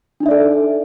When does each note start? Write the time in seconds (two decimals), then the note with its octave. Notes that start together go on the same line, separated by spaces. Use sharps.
0.20 D4
0.23 D#4
0.26 E5
0.28 D5
0.31 A4